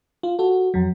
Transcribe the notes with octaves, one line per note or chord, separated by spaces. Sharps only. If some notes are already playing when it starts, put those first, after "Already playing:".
F4
F#4 A4
F2 F#3